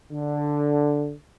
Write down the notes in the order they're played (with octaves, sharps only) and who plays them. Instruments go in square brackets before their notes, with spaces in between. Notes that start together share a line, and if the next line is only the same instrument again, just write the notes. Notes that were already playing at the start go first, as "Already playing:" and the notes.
[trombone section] D3